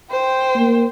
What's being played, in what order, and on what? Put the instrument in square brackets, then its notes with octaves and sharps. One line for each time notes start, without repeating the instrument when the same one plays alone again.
[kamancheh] C5 G5
[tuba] A#3